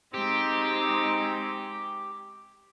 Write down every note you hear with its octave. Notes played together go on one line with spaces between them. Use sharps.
G#3 C4 D#4 G4